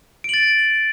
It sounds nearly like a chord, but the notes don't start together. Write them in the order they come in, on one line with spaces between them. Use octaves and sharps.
D7 F#7 A6